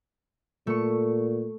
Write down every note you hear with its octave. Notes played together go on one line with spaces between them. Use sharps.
A#2 A3 C#6